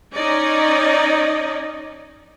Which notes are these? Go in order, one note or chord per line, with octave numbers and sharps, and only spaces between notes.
C#4 D#4 D5 D#5